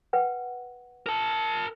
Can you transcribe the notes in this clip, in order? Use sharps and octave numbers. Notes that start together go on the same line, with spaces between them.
B4 F#5 G5
A#4 A5